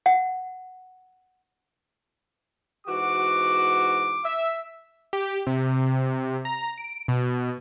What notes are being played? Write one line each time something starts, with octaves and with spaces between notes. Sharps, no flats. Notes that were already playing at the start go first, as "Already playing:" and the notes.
F#5
G#2 E3 F#4 D6
E5
G4
C3
A#5
D7
B2